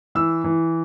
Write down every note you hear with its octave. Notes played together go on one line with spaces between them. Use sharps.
E3 E6
E3